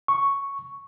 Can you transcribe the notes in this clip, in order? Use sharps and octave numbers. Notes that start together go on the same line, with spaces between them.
C#6